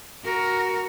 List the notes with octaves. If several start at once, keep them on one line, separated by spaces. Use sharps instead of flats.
F#4 A#4